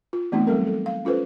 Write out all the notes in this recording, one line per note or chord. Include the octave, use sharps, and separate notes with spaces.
F4
E3 A3 B3 C4 D#4
F#3 G3 C4 A4 A#4
A4
F5
C#4 F4 A4 B4 C5